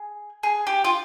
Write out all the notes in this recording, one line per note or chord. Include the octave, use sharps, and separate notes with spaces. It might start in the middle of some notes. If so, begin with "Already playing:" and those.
Already playing: G#4
G#4
G4
F4